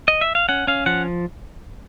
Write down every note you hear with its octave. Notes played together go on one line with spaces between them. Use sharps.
D#5
E5
F5
C#4 F#5
C#4 F5
F3 F#5